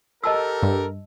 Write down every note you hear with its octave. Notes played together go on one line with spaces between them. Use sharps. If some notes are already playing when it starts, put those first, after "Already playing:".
G4 A4 A#4 D#5 A5 E6
G2